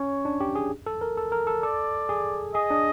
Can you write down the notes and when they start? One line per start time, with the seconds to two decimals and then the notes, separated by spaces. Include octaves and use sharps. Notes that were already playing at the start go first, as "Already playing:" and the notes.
Already playing: C#4 C#5
0.25 D4
0.41 G4
0.55 G#4
0.86 A4
1.01 A#4
1.17 A4
1.32 A#4
1.47 A4
1.63 A4 D5
2.09 G#4
2.54 G#4 D#5
2.71 D4